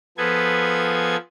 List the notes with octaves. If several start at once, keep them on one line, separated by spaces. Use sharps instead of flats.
F3 B3 G#4 A4 B4 G#6